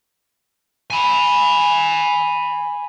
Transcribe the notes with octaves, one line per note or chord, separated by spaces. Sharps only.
G#5 B5